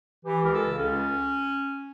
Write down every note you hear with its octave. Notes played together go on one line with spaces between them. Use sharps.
E3 G4
C#2 A#4
A4
C#3
C#2 C#4